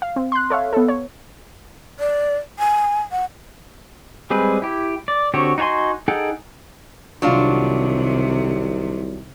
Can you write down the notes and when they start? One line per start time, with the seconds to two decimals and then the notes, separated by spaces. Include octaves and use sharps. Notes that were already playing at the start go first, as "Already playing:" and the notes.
0.02 F5
0.16 C4
0.32 C6 F#6
0.50 A4 C#5 E5 F5
0.73 B3 A4
0.88 C#5
2.00 D5
2.59 G#5
3.12 F#5
4.30 G3 G#3 C4 G#4 B4
4.62 E4 G4
5.08 D5
5.34 D3 C4 F#4 G4 C#5
5.58 D#4 F#4 C#5 G#5 C6
6.08 D#4 G#4 A4 F#5 G5
7.22 C2 C3 D#3 F#3 D4 F4